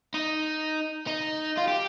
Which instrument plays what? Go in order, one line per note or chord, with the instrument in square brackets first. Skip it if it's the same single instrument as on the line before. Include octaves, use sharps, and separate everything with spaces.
[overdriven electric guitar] D#4
D#4
F4
G4